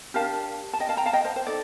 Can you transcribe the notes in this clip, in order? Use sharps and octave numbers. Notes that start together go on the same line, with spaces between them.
D4 G4 A#4 F5 A5
A5
D#5 G5
F5 A5
G5 A#5
F5 A5
D#5 G5
C5 D#5
C5
D#4 A4 D5